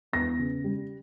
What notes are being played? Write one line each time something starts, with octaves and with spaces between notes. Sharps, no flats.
E2 A#6
C#3
G3